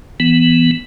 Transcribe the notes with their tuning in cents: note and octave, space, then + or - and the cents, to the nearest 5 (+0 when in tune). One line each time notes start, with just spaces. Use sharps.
E3 +0 B3 +0